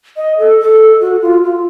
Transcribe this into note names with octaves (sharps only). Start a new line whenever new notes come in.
D#5
A4
A4
F#4
F4
F4